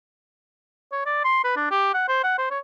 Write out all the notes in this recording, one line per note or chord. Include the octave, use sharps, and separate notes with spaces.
C#5
D5
C6
B4
D4
G4
F#5
C5
F#5
C5
C#5